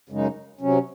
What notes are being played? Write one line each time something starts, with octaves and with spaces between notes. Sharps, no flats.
F#2 C#3 G#3 D#4
C3 F#3 C#4